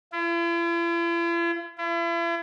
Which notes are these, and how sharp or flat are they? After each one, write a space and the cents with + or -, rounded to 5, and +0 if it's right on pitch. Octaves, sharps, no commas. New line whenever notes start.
E4 +45
E4 +40